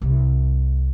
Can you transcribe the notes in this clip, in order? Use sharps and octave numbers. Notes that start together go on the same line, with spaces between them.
C2 C3